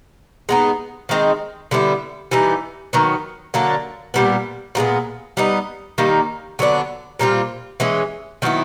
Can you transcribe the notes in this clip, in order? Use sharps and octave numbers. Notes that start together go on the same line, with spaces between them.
G#3 B3 D#4
D#3 G#3 C4 D#4
D3 G3 B3 E4
E3 G3 B3 D#4
D#3 F#3 B3
D3 F#3 A#3 D4
A#2 G3 B3
A#2 F3 G#3 B3
G3 B3 D#4
D#3 G3 A#3 D#4
D3 F#3 B3 D4
A#2 G3 C4 F4
E3 G#3 C#4
D#3 F#3 B3 E4